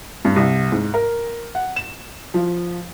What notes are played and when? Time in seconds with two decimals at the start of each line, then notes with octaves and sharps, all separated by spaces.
0.25 G2
0.36 C2
0.72 G#2
0.94 A#4
1.55 F#5
1.76 E7
2.34 F3